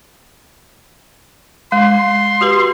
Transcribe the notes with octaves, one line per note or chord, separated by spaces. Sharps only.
G#3 C6
F#4 G4 B4